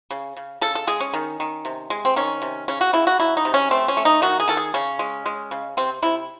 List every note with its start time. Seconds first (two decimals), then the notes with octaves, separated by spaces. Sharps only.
0.11 C#3
0.37 C#3
0.61 C#3 A4
0.75 A4
0.87 G#3 G#4
1.00 C#4
1.13 D#3
1.40 D#3
1.65 C3
1.90 G#3
2.05 C4
2.16 D#3 C#4
2.42 C3
2.68 C#3 C#4
2.81 F#4
2.93 C#3 E4
3.07 F#4
3.20 F#3 E4
3.37 D#4
3.45 C3
3.54 C#4
3.71 A3 C4
3.88 C#4
3.97 A3
4.05 D#4
4.22 D#3 F#4
4.40 G#4
4.48 D#3 A4
4.57 G#4
4.74 C#3 C#4
4.99 G#3
5.26 G#3
5.51 C#3
5.77 C3 C4
6.02 C3 E4